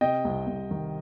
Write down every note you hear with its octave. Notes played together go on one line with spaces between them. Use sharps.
C3 D#5 G5
C2
C2
D#3